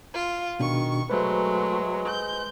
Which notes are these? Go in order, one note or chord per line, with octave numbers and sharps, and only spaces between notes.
F4
B2 D#3 D4 C#6
F#3 G#3 A3 B4 C5
G#3
G6